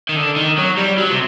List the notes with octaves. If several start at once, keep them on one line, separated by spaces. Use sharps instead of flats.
D#3
D3
D#3
F#3
G3
F#3
C3